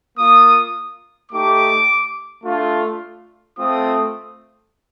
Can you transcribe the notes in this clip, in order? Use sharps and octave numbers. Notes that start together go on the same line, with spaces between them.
A#3 F4 D#6
A3 D#4 G4 D6
A3 D4 F4
A3 C4 F4 D#6